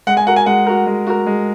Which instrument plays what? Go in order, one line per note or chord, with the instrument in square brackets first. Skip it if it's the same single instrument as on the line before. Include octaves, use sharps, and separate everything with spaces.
[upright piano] G#3 [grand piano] F#5
[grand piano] G#5
[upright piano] F#4 A#4 [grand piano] F#5
[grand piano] G#5
[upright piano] G#3 [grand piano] F#5
[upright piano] F#4 A#4
G#3
F#4 A#4
G#3